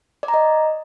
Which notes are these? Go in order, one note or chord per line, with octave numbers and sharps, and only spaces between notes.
D5
A#5
D#5